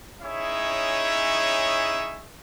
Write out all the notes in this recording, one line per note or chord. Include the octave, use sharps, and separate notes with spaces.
C#4 D#4 E4 G#4 C#5 E5